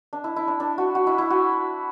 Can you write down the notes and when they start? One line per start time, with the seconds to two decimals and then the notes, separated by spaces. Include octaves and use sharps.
0.13 D4
0.24 E4
0.36 E4
0.48 D4
0.60 D4
0.78 F#4
0.95 F#4
1.07 E4
1.18 E4
1.30 F#4